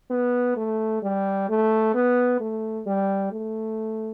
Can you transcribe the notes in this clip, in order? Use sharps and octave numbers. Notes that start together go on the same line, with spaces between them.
B3
A3
G3
A3
B3
A3
G3
A3